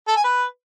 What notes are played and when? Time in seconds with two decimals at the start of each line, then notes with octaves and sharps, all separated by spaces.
0.08 A4
0.16 G#5
0.24 B4